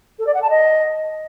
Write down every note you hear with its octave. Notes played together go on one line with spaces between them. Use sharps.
A4
D5
F#5
A5
D#5